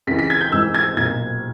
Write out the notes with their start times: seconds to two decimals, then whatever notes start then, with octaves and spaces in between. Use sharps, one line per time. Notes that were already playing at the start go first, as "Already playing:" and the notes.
0.07 C#2 C#3 E3 B6
0.19 B6
0.30 G#6
0.41 G6
0.52 G#1 G#2 E3 E6
0.74 G#6
0.96 B1 A#2 G#6